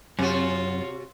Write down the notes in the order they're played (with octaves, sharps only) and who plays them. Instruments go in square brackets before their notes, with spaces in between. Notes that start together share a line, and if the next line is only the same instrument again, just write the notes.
[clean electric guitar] F#2 [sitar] C3 F#4 [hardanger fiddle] F4 C#5